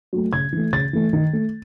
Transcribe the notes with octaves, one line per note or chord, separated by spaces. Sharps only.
F#3 A3
C#3 G#6
E3 A3
C#3 A6
E3 A3
D#3
A3